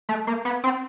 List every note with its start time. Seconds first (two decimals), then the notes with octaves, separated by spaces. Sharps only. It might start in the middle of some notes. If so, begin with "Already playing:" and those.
0.09 A3
0.27 A#3
0.45 B3
0.64 C4